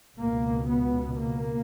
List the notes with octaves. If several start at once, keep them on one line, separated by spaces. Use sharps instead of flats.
C#2 B2 A#3
B3
A#3